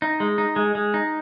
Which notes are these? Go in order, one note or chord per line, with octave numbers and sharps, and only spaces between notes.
D#4
G#3
D#4
G#3
G#3
D#4